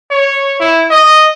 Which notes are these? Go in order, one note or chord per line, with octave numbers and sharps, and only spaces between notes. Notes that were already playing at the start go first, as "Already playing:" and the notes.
C#5
E4
D#5